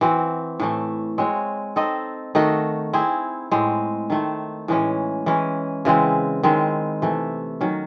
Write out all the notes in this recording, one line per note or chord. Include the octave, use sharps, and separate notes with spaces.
E3 C4 F#4
A2 E3 A3
G#3 C4 F#4 C#5
C4 D#4 A4 D#5
D#3 A3 D#4 F#4
C4 E4 G#4
A2 G#3 C4
D#3 A3 C4
A2 E3 G#3 C#4
E3 G#3 C#4
C#3 E3 G#3 C4
D#3 G#3 C4 E4
C3 E3 A3
D#3 F#3 C#4 F#4